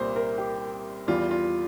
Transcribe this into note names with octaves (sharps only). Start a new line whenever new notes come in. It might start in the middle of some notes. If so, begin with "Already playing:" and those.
Already playing: C2 A#2 G3 A#4 C5
A#4
G4
E2 E3 G3 F4
F4